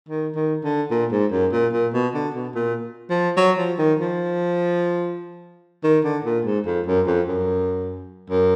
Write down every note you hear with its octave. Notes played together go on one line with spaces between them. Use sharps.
D#3
D#3
D3
A#2
G#2
F#2
A#2
A#2
B2
D3
B2
A#2
F3
F#3
F3
D#3
F3
D#3
D3
A#2
G#2
F2
F#2
F2
F#2
F#2